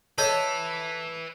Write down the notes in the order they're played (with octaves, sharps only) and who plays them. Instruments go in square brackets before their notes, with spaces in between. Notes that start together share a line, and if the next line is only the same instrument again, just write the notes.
[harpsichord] A4 [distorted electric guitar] B4 E5 [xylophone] C#5 D#5 G6